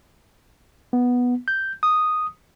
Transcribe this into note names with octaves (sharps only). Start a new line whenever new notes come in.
B3
G6
D#6